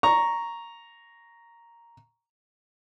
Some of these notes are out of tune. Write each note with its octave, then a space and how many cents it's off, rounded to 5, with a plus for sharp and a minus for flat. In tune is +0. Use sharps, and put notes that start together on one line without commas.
A#5 +0 C#6 +0